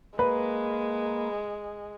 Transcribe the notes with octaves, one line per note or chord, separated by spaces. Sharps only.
G#3 A#3 B4